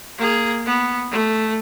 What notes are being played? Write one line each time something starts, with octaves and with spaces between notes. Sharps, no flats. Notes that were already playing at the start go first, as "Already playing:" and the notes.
A#3 G#4
B3
A3